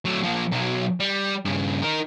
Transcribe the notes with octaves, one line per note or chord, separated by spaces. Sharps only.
F#3 A3
F3 A#3
B1 F#3
G3
G2 C#3
D#4 A#4